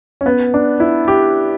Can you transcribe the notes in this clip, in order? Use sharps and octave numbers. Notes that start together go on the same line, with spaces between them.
C#4
B3
D4
E4
G4